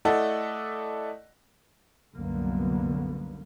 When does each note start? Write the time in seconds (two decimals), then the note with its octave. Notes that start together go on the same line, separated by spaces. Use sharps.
0.05 A3 E4 A4 D5 D#5 F#5
2.14 C2 F#2 D3 F#3 A#3 B3